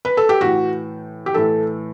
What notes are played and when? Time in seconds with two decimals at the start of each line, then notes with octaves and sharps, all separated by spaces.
0.05 B4
0.17 A4
0.29 G4
0.41 A2 E3 F#4
1.26 G4
1.34 A2 E3 A4